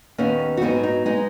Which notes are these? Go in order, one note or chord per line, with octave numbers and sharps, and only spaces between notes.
D#2 D#3 B3 C#4
F#4
G#2 F#3 B3 D#4
D#4
G#3 B3 D#4